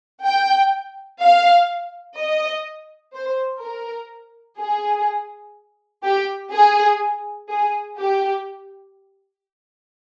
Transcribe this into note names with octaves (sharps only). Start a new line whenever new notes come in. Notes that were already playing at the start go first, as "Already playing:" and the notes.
G5
F5
D#5
C5
A#4
G#4
G4
G#4
G#4
G4